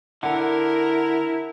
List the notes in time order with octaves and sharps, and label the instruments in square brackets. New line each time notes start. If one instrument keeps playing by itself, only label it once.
[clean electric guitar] D3 [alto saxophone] E4 [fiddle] A#4 [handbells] F#5